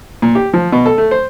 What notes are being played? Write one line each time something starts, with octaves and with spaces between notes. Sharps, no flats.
A#2
G4
F3
B2
A4
A3
C5